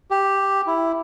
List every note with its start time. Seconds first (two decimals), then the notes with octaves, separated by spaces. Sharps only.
0.11 G4
0.67 E4